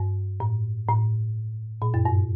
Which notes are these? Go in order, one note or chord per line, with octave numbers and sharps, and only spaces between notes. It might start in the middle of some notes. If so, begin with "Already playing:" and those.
Already playing: G2
A2
A2
A#2
F#2
G2